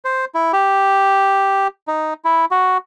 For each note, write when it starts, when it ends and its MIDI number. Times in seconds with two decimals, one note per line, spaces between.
0.05 0.25 72
0.35 0.52 64
0.53 1.67 67
1.88 2.14 63
2.25 2.45 64
2.51 2.77 66